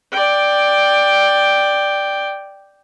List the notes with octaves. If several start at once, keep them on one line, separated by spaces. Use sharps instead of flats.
D5 G5